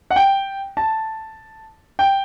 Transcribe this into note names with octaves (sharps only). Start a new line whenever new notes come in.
F#5
G5
A5
G5